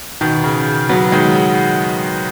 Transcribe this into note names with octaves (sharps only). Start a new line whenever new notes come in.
B2 D#3
C#3
F#3 B3
D#3 G#3